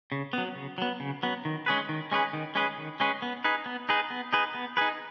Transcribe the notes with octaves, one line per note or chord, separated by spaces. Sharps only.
C#3
F#3 B3
C#3
F#3 B3
C#3
F#3 B3
D#3
G#3 C#4 G#4 B4
D#3
G#3 C#4 G#4 B4
D#3
G#3 C#4 G#4 B4
D#3
G#3 C#4 G#4 B4
B3
D#4 G#4 B4
B3
D#4 G#4 B4
B3
D#4 G#4 B4
B3
D#4 G#4 B4